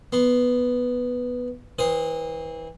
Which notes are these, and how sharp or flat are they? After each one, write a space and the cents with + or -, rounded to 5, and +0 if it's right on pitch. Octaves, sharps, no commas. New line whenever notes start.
B3 +0 C6 +0
E3 -30 C5 +0 D#6 +0